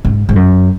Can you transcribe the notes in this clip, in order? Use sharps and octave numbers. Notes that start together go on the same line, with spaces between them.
G#2
G#2
F#2